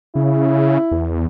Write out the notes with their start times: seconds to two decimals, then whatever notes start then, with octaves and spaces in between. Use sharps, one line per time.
0.16 C#3 E4
0.92 E2